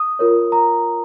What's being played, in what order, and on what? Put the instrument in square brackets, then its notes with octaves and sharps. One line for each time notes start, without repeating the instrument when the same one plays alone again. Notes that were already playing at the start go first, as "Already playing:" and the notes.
Already playing: [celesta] D#6
F4 A#4 C#5
A#5